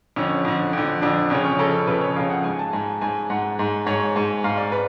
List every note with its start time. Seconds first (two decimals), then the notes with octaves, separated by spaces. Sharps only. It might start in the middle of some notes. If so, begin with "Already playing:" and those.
0.16 F2 D3 C#4
0.45 F2 D3
0.73 F2 D3
1.02 F2 D3 D4
1.30 F2 C#3 C#4
1.45 C#4
1.59 F2 C#3 A4
1.87 F2 C#3 B4
2.01 C#5
2.16 F2 C#3 F5
2.30 F#5
2.44 G#2 G#5
2.59 A5
2.73 G#2 G#5
3.01 G#2 G#5
3.30 G#2 F#5
3.59 G#2
3.86 G#2 C#5
4.16 G#2
4.44 G#2 F5
4.57 D5
4.72 B4